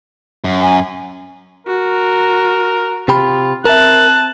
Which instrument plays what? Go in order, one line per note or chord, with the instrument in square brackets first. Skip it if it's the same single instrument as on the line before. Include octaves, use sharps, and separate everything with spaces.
[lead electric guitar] F#2
[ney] G#5
[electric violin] F#4 [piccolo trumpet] A#4
[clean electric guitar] C3 G4 B5 [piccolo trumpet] F4
[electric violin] C4 A5 [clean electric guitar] A#4 E5 [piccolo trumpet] F#6